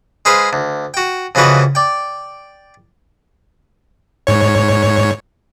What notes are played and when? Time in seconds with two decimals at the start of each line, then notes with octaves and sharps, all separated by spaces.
0.25 G#3 G#4 B4 C5 F5
0.53 D2
0.94 F#4 G5
1.35 F2 C#3 E3 F#4 B4 D#5
1.75 D5 G5
4.27 G#2 C#5